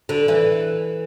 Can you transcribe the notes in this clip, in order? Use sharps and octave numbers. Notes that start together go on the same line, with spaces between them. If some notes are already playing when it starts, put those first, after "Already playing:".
D3
E3